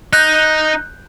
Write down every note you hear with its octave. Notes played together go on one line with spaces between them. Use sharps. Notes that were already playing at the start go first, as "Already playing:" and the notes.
D#4 F#6 G6